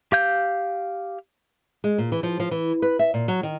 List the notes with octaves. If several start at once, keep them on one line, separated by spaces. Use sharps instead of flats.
G4 F5 G6
G#3
A#2
E3
F3
F3
E3
B4
E5
A#2
F#3
D#3